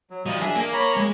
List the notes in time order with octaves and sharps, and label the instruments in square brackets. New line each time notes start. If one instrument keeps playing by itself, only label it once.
[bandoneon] F#3
[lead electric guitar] F#3 F4 [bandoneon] G3 D#5 D#6
[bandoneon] D4 E5 [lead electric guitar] G#4
[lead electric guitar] A#3 [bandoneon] D6
[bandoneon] C#5 A#5 B5
[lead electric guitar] G#3 [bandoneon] A#3